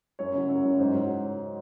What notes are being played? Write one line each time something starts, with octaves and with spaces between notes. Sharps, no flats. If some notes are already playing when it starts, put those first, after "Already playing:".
F#2 C#5
C#3 F#3
F#2
C#3 F#3
G#2 C5
F#3